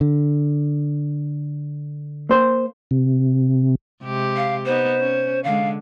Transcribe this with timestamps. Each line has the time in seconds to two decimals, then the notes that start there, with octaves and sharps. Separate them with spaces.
0.01 D3
2.29 A#3 C5
2.91 C3
4.03 C3 G#3 G4
4.36 F5
4.66 B3 D#4 C5
5.00 C#4
5.44 D3 G#3 F5